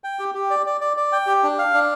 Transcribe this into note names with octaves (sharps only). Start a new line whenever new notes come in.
G5
G4
G4
D5
D5
D5
D5
G5
G4
D4
F5
D4